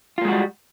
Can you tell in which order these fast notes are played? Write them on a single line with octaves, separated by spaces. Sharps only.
F4 A#3 G#3 F#4 G3